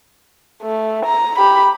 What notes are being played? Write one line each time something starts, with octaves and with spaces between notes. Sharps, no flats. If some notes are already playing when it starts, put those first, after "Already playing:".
A3
A#5
G4 B5